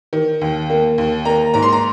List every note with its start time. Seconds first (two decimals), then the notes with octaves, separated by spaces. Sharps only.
0.13 D#3
0.41 D#2
0.70 A#3
0.98 D#2
1.25 A#3 A#5
1.54 G#2 A#5
1.63 C6
1.72 A#5